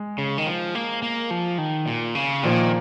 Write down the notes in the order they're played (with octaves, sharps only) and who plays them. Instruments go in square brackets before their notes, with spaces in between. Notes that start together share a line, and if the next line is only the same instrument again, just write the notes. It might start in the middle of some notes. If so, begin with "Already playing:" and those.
Already playing: [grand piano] G#3
[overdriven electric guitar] C#3
D#3
F3
A#3
A#3
F3
D#3
A#2
C#3
[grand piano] A#2 F3 A#3 [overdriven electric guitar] D#3